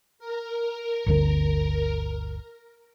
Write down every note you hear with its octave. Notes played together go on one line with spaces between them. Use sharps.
A#4
G1 D2 D3